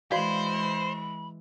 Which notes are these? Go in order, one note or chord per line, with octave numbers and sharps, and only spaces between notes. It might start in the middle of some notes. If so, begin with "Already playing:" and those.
E3 G#3 F#4 C5 D5 F5 B5